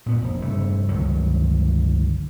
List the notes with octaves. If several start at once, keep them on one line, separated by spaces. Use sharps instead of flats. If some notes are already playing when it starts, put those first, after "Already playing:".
A#2 B3
F1
G2 C#3 A3
G1 C#2 D#3 F#3